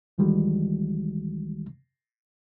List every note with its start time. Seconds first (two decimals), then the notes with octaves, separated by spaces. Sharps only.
0.18 C#2 D#3 E3 G3 G#3 F#4